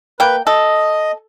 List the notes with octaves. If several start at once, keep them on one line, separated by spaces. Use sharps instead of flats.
A#3 B4 G5
A4 D#5